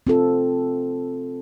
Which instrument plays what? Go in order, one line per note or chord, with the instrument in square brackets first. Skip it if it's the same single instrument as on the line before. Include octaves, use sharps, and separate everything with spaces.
[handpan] C4 F4 A4